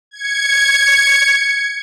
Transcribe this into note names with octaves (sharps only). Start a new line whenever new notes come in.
G#6 C#7